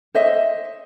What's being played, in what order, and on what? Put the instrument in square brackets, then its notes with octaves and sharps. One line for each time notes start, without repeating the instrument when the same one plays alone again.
[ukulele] C5 D#5 E5